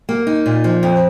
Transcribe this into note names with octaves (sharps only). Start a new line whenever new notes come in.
A#3
D#4
A#2
F3
F2